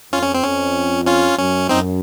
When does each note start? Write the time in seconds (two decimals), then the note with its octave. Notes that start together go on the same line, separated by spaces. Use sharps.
0.13 F2 C#4 F4
0.23 C#4
0.34 C4
0.44 F2 C#4
1.07 C#4 F4
1.39 F#2 C#4
1.69 F#2 C4 D#4